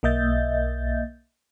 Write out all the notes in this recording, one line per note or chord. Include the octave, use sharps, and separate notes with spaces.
B1 A#3 D#5 E5 G6 A6